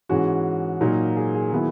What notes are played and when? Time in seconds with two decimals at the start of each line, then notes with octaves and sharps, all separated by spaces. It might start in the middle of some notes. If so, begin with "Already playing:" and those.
0.09 G#2 E3 G#3 C#4 F#4
0.81 A#2 F#3 A#3 D#4
1.16 G#4
1.34 G#4
1.52 D#3 F#3 B3 E4